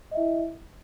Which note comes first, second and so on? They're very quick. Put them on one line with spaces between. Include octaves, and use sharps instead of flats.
D#5 E5 E4